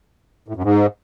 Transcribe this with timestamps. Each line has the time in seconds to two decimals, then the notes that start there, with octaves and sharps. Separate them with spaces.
0.48 A2
0.56 F#2
0.64 G#2